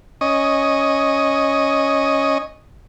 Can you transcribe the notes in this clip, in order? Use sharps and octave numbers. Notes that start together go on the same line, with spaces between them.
C#4 D#5